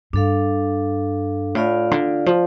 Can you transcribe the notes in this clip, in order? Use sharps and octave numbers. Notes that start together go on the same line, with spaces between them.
G2 D4 A4 F5
A2 F4 D5 F5
D3
F3